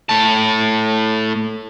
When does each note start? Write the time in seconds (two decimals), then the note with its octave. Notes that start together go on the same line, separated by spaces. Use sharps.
0.09 A2 A5